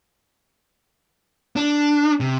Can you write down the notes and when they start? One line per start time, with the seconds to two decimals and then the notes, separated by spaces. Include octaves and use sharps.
1.56 D4
2.21 C3